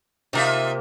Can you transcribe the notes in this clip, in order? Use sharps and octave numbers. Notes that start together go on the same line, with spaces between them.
C3 A#3 D#4 F4 E5